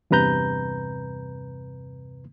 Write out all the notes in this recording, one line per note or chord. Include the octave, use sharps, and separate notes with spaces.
E2 G2 C3 B4 A#5 G6